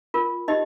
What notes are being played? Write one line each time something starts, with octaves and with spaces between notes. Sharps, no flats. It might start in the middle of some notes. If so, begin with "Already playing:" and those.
F4 A#4
D#4 G4 D#5